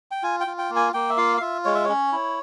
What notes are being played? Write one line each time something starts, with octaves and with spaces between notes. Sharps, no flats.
G5
F4 G#5
G5
F4
G5
A#3
G#5
A#3 G5
E5
F4 F5
F5
F4 E5
G#3 C#5
E5
C#4 C#5
E4